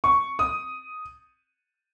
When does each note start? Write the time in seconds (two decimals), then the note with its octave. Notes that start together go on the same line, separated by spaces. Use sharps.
0.04 C#6
0.39 D#6